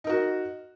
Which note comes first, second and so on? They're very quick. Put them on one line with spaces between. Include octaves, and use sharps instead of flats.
D#4 A#4 F#4